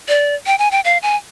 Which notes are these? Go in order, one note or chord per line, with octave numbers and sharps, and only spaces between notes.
D5
G5
G#5
G5
F5
G#5